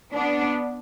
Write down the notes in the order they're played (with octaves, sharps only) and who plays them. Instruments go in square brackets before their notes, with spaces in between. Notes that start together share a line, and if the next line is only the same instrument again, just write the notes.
[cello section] B3 D4